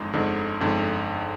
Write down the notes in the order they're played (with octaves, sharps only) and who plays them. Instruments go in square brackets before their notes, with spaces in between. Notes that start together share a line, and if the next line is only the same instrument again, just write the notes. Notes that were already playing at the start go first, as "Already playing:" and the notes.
Already playing: [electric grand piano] G1 F2 D3 G#3 D#4
G1 F2 D3 G#3 D#4
G1 F2 D3 G#3 D#4